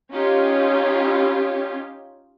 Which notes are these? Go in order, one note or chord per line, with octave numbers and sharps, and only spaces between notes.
C#4 D#4 F4 G4 C#5